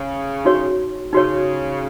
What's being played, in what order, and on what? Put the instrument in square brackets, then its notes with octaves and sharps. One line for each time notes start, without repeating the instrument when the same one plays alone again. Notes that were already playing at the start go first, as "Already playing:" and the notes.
Already playing: [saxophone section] C#3
[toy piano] D#4 F#4 C#5
[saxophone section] C#3 [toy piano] D#4 F#4 C#5